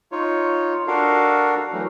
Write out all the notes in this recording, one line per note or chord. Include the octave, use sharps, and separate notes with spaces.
D#4 F4 C#5
D4 F#4 A4 A#4 F5
E3 F#3 A3